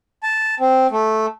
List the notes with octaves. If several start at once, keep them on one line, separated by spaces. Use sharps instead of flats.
A5
C4
A3